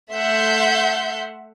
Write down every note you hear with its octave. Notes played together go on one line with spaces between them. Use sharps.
A3 E5 F#5 C6 G6